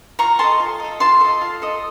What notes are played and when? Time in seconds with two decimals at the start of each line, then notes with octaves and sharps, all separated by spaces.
0.19 F4 A#5 C#6
0.39 A4 D#5 A5 C6
0.60 F4
0.80 A4 D#5
1.00 F4 A5 C6
1.21 A4 D#5
1.41 F4
1.62 A4 D#5